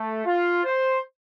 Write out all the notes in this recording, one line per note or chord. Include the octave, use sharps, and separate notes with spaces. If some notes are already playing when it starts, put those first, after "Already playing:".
Already playing: A3
F4
C5